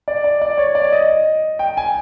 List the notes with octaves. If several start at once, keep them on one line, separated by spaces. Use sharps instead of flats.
D5
D5
D5
C#5
D5
D#5
G5
G#5